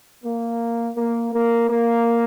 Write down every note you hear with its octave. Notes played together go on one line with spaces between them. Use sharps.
A#3
A#3
A#3
A#3